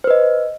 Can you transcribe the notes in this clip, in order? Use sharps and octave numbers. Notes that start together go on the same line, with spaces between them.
B4 C5 D#5